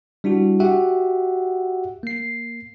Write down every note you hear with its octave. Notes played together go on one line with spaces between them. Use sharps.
G3 D4 E4 F#4
F#4 G4 E5 F#5
A#3 C7